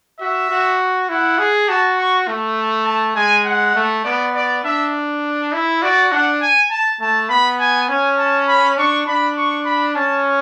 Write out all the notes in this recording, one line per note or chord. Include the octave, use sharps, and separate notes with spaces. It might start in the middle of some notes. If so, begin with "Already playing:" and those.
F#4 E5
F#4
E4 F#5
G#4
F#4 A5
C#6
A3
A5
G#3 G#5
F#5
A3
B3 D5
D5
D4 E5
E4 E5
F#4 D5
D4 F#5
G#5
A5
A3 A5
B3 B5
G#5
C#4 G#5
A5
B5
D4 C#6
D4 B5
C#6
B5
C#4 A5